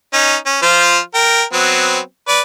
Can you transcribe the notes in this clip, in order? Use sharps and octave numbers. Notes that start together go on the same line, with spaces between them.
C#4 D#4
C#4
F3 F4 C5
A#4 G5
F#3 B3 C4
B4 D5